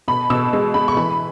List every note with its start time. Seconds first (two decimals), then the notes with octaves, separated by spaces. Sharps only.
0.08 B2 B5
0.30 B2 E6
0.53 G#3
0.74 G#3 B5
0.88 C#6
0.97 E3 B5